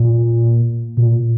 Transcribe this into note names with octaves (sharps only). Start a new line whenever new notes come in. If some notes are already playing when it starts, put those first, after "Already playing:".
Already playing: A#2
A#2